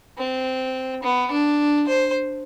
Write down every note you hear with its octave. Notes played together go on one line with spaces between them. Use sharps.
C4
B3
D4
C5